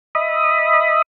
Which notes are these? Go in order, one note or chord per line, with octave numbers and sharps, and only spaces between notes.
D#5 E5 B5 D#6